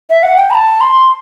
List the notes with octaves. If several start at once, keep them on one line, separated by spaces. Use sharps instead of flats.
E5
F#5
G5
B5
A5
C6